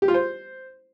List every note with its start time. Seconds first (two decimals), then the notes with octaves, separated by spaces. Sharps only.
0.02 G4
0.08 F4
0.14 C5